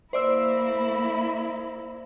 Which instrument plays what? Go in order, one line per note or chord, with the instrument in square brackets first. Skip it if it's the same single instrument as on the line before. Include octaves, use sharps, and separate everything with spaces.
[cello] A#3 E4 [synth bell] C5 D5 E6